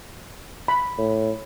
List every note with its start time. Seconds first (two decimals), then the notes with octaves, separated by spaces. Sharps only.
0.68 B5
0.98 A2